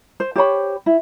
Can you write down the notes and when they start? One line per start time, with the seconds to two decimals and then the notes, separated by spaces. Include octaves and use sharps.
0.20 C5
0.36 G4 C5 C#5 B5
0.86 E4